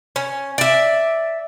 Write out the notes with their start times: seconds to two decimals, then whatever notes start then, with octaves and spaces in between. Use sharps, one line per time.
0.16 C#4
0.58 D5 E5